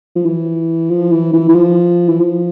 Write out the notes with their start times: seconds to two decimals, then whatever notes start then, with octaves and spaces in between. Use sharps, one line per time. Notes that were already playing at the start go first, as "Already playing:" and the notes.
0.16 F3
0.25 E3
0.91 F3
1.12 E3
1.33 E3
1.49 E3
1.55 F3
2.09 E3
2.20 F3